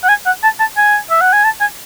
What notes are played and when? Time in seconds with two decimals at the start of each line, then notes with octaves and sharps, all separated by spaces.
0.03 F#5
0.09 G#5
0.26 F#5
0.43 A5
0.60 A5
0.77 G#5
1.10 E5
1.21 F#5
1.33 G#5
1.44 A5
1.61 G#5